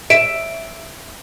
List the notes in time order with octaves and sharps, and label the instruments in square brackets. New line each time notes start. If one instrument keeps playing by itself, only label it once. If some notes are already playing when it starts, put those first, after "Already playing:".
[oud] E5 [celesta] D7